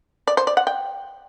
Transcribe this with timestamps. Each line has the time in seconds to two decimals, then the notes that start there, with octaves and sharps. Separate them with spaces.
0.28 D5
0.37 C5
0.47 D5
0.57 F#5
0.67 G5